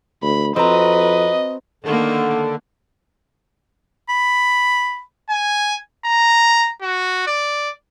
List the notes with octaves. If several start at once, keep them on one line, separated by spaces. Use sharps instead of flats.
D2 B5
F2 C4 F#4 B4 D#5 A#5
D3 D#3 A#3
B5
G#5
A#5
F#4
D5